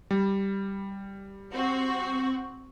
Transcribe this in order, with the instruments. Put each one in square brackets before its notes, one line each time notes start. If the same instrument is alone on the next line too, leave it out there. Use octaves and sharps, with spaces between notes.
[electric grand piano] G3
[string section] C4 F#4